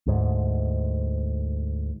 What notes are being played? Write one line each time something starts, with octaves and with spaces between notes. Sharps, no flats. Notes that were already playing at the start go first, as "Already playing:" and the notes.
D2 G#2